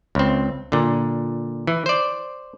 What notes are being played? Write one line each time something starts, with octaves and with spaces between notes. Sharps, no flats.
C#2 C4
A#2 D3
E3
C5 D5